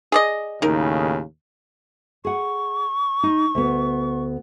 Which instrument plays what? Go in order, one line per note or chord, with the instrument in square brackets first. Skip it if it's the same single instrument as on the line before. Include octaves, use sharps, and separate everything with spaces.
[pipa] G#4 D5 D#5
[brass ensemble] D#2 A2 C#3 [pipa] D#4 A#4
[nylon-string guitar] G#4 F#5 [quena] C#6
[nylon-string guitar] D#4
D2 B3